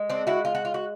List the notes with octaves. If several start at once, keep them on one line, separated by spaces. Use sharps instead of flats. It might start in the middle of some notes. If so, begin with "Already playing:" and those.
Already playing: G#3
C4 D4
E4 F#4
F4
F#4
F4
F#4